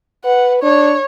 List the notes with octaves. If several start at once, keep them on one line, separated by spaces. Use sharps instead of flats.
B4 F#5
D4 C#5